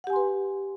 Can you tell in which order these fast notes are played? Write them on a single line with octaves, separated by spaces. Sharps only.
F#5 G4 G#5 C6 B4